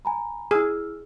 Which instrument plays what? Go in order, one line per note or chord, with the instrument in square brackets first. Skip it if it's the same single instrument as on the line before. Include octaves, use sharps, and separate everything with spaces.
[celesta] G#5 A#5 B5
[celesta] E4 E6 F6 [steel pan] G#4